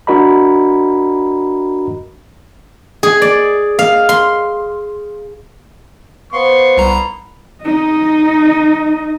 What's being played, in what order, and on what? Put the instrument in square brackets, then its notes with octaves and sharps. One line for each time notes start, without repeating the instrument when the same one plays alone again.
[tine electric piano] D4 F#4 A#4 D#5 A#5 B5
[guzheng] G#4
D5
F5
C6
[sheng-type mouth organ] B3 C6 [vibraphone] C5 F5 [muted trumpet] C#6
[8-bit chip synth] C2 A#5 [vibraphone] B5
[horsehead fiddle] D#4 D#5